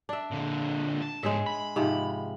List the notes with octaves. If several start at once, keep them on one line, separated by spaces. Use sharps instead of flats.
D4 E5
A#2 D3
A5
G#2 G#3 G#4 C#5 E5
B5
G#2 C3 F3